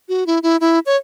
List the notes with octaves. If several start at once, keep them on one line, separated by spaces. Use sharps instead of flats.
F#4
E4
E4
E4
C#5